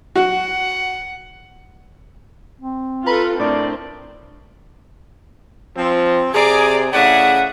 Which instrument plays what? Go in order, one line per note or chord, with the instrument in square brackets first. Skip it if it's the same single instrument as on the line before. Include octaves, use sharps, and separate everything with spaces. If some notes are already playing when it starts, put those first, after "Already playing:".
[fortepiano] F#4 [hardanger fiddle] F#5
[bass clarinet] C4
[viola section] F4 A4 [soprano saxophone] B4 [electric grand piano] A#5
[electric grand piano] A2 A#4 [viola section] C4 [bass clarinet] D4 [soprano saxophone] D5
[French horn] F3 [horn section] C4
[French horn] C3 [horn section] G#4 [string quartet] D5 A#5 D6
[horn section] A2 D5 F#5 [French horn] C#3 [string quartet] E5 D#6